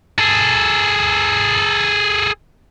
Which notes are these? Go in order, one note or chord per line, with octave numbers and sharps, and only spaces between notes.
G#4 A4